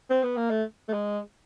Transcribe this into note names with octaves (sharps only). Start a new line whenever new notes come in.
C4
B3
A#3
A3
A3
G#3